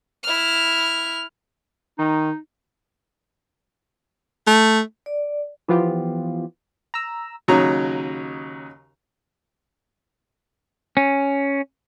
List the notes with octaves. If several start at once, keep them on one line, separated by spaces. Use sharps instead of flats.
E4 F6
D#3 D#4
A3
D5
E3 F3 B3 F4 G4
A#5 E6
D#2 C#3 F#3 D#4 A#5
C#4